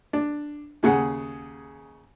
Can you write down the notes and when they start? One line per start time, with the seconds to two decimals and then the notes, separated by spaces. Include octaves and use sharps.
0.13 D4
0.83 D#2 C#3 G#4 F#5